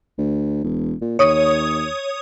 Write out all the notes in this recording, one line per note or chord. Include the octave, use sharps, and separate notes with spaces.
D2
E1
A#2
D#2 C#5 D#6